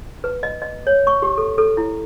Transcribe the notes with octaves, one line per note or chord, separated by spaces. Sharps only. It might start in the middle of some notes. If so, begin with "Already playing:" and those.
B4
D#5
D#5
C#5
C#6
G4
A4
A4
E4